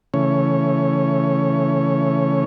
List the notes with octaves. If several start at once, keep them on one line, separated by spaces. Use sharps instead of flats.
C#3 E3 A3 C#4 C#5